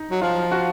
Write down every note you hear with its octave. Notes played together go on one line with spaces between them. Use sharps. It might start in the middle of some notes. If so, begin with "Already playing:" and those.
Already playing: D#4
F#3
F3 F4
F#4